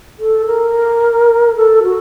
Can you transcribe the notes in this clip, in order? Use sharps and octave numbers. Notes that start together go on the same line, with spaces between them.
A4
A#4
A4
F#4